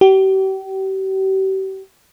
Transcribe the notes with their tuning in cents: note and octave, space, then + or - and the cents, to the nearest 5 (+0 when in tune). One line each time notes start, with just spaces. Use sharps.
G4 -40